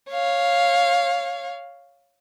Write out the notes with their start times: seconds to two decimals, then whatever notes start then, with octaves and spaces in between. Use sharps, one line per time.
0.11 C#5 F5